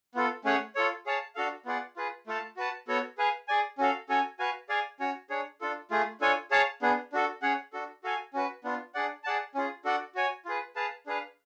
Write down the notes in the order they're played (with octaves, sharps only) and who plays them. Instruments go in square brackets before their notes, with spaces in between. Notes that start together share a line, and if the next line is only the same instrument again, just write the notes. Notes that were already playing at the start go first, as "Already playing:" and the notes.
[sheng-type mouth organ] B3 F4 A4
A3 C#4 G#4 C#5 F#5
F4 A4 C#5
G#4 C#5 F5 A5
D4 F#4 A4 F5
B3 F4 G#4 D5 F#5
F4 G#4 B4
A3 F4 A4 F5 A5
F#4 B4 F#5 A5
B3 F#4 A4 C#5
G#4 B4 F5 G#5
G#4 D5 G#5
C#4 F#4 A4 F5
C#4 F#4 A4 C#5 G#5
F#4 B4 F5 G#5
G#4 D5 F5 G#5
C#4 F#4 C#5
D4 G#4 C#5
D4 F4 A4
A3 F4 G#4
D4 F4 A4 C#5 G#5
G#4 C#5 F5 A5
B3 D4 G#4
D4 F#4 A4
C#4 G#4 C#5 F#5
D4 F#4 A4
F#4 A4 F5 G#5
C#4 F#4 B4
B3 D4 F4
D4 G#4 D5 F#5
G#4 D5 F#5 A5
C#4 F4 G#4
D4 F#4 A4 D5 F#5
F#4 C#5 G#5
F4 G#4 B4
G#4 B4 F5 A5
D4 G#4 B4 F5